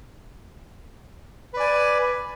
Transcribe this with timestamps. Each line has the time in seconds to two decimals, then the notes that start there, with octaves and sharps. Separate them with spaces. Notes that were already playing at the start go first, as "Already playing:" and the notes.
1.53 B4
1.57 D5
1.60 G#5